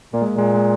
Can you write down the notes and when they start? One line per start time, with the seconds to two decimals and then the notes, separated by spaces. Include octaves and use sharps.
0.13 A#2 A#3
0.22 G#3
0.33 A#2
0.38 G#3
0.55 G#3